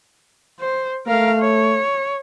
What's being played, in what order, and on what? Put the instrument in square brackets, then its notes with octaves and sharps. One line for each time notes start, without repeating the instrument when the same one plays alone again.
[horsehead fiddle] C5
[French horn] A3 [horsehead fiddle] A#4 F5
[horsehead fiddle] C#5